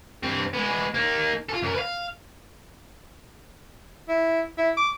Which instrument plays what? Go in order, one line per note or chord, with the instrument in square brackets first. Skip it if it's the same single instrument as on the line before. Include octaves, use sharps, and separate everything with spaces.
[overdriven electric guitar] G2 C4
G#3 B3
A#3 D#4
F4 A4
F#2 A#4
B4 F5
[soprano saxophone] E4
E4
D6